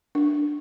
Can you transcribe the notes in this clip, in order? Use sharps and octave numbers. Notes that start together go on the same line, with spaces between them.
D4